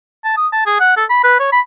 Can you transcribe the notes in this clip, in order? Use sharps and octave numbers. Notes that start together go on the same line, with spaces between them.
A5
D#6
A5
G#4
F#5
A4
B5
B4
C#5
B5